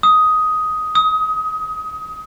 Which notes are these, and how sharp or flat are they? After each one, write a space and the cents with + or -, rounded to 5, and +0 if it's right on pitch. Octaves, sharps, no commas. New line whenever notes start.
D#6 +10
D#6 +25